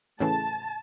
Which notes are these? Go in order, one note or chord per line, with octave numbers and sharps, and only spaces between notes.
A2 C#3 E3 A5